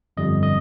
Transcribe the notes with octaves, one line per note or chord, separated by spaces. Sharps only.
G1 F2 D3 G3 D#5
D#5